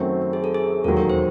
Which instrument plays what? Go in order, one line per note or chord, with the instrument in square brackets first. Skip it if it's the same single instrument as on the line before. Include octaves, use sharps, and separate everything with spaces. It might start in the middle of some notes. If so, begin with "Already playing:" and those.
Already playing: [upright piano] F#2 D#3 F#3 A3 C4
[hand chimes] G#4
A4
G#4
[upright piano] E1 D#2 D#3 F#3 [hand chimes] A4
[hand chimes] A#4
C5